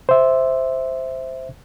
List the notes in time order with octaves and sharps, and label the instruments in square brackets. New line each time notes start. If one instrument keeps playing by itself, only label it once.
[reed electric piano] C5 E5